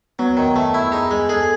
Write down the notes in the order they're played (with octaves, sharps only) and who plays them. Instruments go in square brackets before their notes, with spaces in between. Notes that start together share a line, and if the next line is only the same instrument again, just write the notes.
[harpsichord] F#3 [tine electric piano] B3
[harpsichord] D#3
A3
E4
[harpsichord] D#4 [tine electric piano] G#4
[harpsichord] G#3
[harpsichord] G#4 [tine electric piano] A4